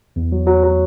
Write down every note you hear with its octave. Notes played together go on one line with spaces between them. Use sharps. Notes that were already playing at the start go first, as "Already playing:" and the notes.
E2
F#3
F#3
F#3